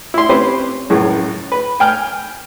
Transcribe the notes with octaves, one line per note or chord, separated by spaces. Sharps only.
E4 C6
C4 C#4 G4 B4 C5
C#2 F#2 A2 C#3 G#3
B4
G5 G#5 F6